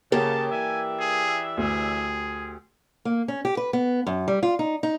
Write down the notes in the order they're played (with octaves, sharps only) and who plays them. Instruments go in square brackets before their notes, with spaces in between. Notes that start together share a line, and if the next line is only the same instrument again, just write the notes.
[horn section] C#3 [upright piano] A#3 [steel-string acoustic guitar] G4 [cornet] A5
[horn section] E3 D5 E5 [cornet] G#5
[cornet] G#4
[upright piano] D2 [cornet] G#4
[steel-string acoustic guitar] A#3
C#4
G4
B4
B3
F#2
G3
F4
D#4
D#4